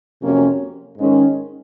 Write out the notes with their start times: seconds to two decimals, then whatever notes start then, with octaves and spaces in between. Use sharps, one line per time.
0.22 F2 C3 F#3 A#3 C#4
0.97 G#2 D#3 G#3 C#4